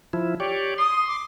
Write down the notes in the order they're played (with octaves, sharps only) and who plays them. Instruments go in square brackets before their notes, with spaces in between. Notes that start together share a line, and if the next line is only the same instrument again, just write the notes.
[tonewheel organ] F3 E4
G4 C#5 D5
[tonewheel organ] C6 [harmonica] D#6
[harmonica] D6